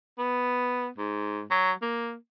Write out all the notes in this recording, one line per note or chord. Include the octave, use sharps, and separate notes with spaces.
B3
G#2
F#3
A#3